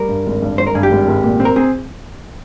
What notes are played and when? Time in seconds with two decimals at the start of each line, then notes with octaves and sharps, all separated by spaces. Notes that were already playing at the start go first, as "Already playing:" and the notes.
Already playing: G3 A#4
0.09 G2
0.26 G#1
0.42 G2
0.58 G#1 C5
0.67 A#4
0.75 G2 G#4
0.83 G4
0.91 G#1
1.08 G#1
1.24 A#2
1.40 C4
1.45 A#4
1.56 C4 G#4